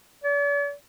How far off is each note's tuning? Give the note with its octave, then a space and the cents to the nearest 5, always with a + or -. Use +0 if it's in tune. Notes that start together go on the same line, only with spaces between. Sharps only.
D5 -45